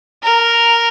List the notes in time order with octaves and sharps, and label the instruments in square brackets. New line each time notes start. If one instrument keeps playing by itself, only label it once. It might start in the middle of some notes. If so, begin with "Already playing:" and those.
[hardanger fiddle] A#4